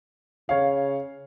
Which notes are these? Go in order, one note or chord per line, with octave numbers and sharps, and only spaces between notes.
C#3 C#5 F5